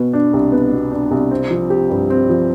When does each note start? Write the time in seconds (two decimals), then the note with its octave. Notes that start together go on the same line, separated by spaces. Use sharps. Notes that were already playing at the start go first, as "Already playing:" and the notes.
Already playing: B2 B3
0.13 D4
0.33 C2
0.52 B3
0.72 B2
0.92 D4
1.11 C2
1.31 C4
1.50 F3
1.70 G4
1.90 G2
2.10 C4
2.29 F3